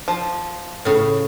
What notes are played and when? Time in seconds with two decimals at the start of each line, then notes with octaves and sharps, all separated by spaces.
0.08 F3
0.85 A2 C#3